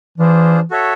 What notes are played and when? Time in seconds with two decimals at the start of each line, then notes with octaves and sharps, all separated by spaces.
0.18 E3 D4 F4 G#4 C5
0.71 F#4 A4 C#5 E5